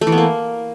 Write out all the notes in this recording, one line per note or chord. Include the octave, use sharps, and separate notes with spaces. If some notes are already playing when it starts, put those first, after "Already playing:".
A3
E3
B3
A#3